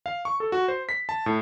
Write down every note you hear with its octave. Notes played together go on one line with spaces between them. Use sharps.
F5
C#6
A4
F#4
C5
B6
A5
A2